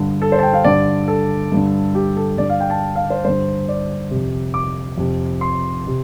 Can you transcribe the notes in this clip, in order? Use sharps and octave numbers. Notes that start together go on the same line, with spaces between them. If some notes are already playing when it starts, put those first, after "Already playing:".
Already playing: G2 D3
A4
C5
A5
G5
F5
G2 D3 D5
A4
G2 D3
G4
A4
G2 D3 D5
F5
G5
A5
F5
C5
G2 D3 C5
D5
C3
F2
D6
F2 C3
C6
C3